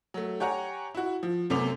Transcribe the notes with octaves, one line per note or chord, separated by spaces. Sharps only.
F#3 A3
G4 C#5 F#5 G#5 A#5
E4 F#4
F3
F#2 C3 A3 B3 D6 F7